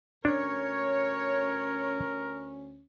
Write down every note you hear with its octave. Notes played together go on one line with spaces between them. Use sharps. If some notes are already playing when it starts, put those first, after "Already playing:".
D2 C#4 D4 A#4 C#5